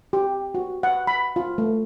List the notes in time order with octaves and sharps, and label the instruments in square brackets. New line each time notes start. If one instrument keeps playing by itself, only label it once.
[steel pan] G4
F#4
F#5
B5
F4
A3